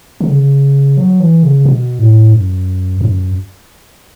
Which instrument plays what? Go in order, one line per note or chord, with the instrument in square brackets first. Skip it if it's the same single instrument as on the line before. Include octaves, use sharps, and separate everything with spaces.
[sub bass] D3
C#3
F#3
E3
C#3
B2
A2
F#2
F#2